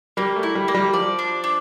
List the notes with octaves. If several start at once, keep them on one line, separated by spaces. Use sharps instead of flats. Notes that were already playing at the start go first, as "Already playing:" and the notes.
G3 A#3
A3
E4
G3
A#3
G3
F3 D5
D4
D4